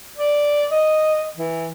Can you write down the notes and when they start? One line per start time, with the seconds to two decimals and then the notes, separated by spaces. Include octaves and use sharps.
0.17 D5
0.71 D#5
1.36 E3